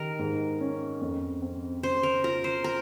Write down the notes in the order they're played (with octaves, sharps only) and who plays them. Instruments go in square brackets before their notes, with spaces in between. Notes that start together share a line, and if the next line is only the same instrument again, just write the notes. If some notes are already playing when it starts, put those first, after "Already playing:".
Already playing: [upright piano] D#3 G4 [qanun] A#4
[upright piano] G#2
C#4
F2
C4
[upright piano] C#3 [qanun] C5
[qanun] A#4
[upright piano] F4 [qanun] A#4
[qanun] C5
A#4